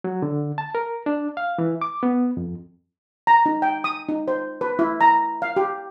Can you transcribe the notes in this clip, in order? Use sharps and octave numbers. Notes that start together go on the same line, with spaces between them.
F#3
D3
A5
A#4
D4
F5
E3
D6
B3
F2
A#5
D#4
G5
D#6
D#4
C5
B4
E4
A#5
F5
G4